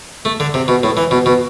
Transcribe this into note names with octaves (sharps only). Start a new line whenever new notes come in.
A3
D3
C3
B2
A2
E3
B2
B2